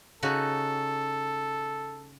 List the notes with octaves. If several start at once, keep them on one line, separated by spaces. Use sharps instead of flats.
C#3 D#4 F#4 A4